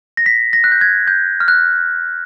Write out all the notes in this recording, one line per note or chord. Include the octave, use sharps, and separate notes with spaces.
A#6
B6
A#6
F#6
G6
G#6
G6
F6
F#6